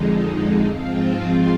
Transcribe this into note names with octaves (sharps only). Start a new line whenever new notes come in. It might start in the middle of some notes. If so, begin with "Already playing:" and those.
Already playing: F2 D3 G#3 D#4
G#2 F3 C4 F4